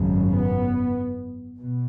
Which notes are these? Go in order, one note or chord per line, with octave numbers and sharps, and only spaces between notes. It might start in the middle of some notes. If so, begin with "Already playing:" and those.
Already playing: G#1 F#2 C#3
B3
B2